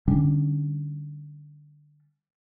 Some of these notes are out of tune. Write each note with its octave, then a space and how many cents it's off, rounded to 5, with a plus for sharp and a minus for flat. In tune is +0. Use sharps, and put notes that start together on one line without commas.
D3 +15 G3 -10 C#4 +0